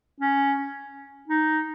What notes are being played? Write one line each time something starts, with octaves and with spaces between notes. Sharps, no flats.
C#4
D#4